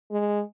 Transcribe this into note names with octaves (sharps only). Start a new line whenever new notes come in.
G#3